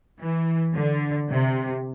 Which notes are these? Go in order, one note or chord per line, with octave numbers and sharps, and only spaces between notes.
E3
D3
C3